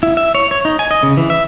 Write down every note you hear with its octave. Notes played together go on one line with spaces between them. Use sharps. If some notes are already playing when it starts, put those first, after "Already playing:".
E4
E5
C#5
C#5
D#4
G#5
D#5
C#3
E3
E5